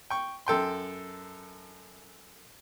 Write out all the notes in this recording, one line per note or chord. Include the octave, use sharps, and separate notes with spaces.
G5 C#6
F#2 A4 G5 C6